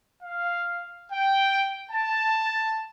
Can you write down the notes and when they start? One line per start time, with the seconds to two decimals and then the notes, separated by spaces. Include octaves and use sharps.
0.23 F5
1.13 G5
1.92 A5